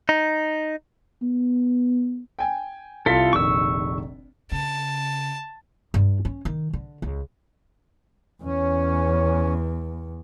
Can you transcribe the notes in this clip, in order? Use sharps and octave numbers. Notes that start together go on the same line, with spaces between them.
D#4
B3
G5 G#5
C2 E4 F4 A4 B6
F1 A#1 D#3 C#6 E6
C#3 A5
G2
C#4
D#3
D3
C#2
E2 C#4